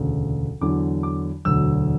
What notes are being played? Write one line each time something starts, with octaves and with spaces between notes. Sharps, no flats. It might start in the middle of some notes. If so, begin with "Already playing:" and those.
Already playing: E1 D2 C#3
E2 D3 F#3 D6
D6
E1 D2 D3 F#3 E6